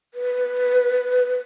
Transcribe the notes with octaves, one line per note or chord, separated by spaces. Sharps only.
B4